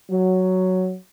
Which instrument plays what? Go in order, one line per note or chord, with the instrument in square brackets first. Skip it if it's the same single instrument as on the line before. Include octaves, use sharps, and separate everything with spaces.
[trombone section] F#3